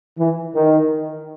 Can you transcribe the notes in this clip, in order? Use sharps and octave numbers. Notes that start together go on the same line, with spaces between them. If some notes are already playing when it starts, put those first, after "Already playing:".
E3
D#3